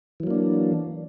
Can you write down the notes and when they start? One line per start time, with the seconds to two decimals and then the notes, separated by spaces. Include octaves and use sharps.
0.20 E3
0.23 F#3
0.27 A#3
0.31 D4